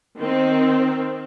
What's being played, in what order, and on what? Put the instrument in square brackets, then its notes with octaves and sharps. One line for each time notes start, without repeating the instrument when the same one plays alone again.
[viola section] D#3 C4